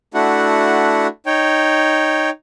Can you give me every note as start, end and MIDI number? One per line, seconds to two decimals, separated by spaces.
0.14 1.07 57
0.14 1.07 62
0.14 1.07 64
0.14 1.07 66
0.14 1.07 78
1.26 2.30 63
1.26 2.30 73
1.26 2.30 79